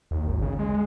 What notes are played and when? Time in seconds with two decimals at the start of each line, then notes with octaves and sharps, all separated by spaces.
0.11 D#2
0.28 G#1
0.42 C#3
0.59 G#3